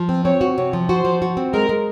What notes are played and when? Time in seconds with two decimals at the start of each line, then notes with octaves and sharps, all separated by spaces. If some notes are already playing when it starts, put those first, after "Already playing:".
Already playing: F3
0.09 C4
0.25 C4 C#5
0.41 F#4
0.57 C3 C#5
0.73 F3
0.89 F#4 C5
1.05 F3
1.22 F#4
1.37 C4
1.53 G#3 A#4
1.69 G#3